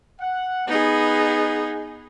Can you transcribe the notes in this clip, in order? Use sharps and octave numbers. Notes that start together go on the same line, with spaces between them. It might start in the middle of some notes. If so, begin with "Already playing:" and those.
F#5
B3 D#4 G#4